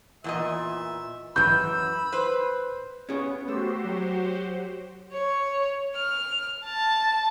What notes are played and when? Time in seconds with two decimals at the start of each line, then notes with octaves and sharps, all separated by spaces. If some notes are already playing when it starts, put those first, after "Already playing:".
0.24 E2 A#2 D#5 E5
1.36 F#2 E3 B5 E6 G6
2.13 B4 C5
3.09 B3 C#4 G#4 C#5
3.48 A3 F#4 G4 C5 E6
3.84 F#3
5.13 C#5
5.95 F6
6.65 A5